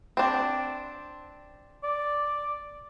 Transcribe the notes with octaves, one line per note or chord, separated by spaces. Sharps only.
C4 D4
D5